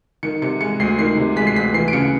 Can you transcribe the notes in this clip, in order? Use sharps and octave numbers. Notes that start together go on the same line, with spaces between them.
D#3 C#7
C3 C#7
G#3 C#7
D2 C7
D#3 C7
C3
G#3 B6
C7
D2 B6
E3 C7
D7
C#3 C#7